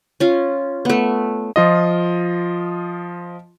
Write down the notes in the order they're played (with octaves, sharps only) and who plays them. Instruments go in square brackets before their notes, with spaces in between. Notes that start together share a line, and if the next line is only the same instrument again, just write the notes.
[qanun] C#4 F4
A3 B3
[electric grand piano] F3 F4 D#5